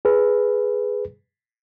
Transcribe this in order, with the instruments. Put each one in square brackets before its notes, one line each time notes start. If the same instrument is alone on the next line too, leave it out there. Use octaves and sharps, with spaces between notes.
[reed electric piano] G#4 B4